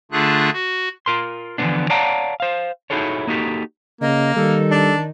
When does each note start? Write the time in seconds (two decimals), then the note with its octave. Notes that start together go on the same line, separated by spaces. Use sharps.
0.12 D3 A3 D4 F4 G#4 F#6
0.53 F#4
1.06 F4 A#4 C6
1.58 D3 E3 F3 G#3 B3 D4
1.90 C#5 D5 F5 F#5 A5 A#5
2.40 C5 F5
2.90 D#4 E4 F#4 G#4 A4 C#5
3.27 A#3 D#4 F#4 G4 A4
4.01 C#3 A#3 D#5
4.36 D#3 G3 A4
4.71 D4